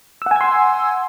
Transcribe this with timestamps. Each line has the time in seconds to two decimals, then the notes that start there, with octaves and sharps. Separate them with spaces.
0.22 E6
0.26 F#5
0.31 G#5
0.36 G#6
0.41 C6